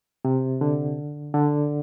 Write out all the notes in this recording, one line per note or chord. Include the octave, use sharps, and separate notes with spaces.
C3
D3
D3